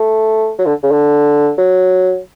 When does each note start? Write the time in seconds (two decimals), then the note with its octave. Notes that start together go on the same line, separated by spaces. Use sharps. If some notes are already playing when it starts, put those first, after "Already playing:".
Already playing: A3
0.59 F#3
0.66 D3
0.83 C#3
0.91 D3
1.58 F#3